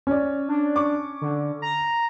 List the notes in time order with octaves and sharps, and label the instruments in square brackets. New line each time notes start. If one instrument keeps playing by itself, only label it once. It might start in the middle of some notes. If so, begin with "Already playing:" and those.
[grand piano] C#4 [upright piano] C#5 D5
[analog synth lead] D4
[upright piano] C#6 D6
[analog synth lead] D3
A#5